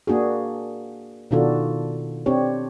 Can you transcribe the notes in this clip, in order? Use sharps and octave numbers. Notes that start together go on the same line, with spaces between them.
A#3 D4 F#4 G#4
B2 D#3 D4 F4 F#4 A4
C4 D4 G4 C#5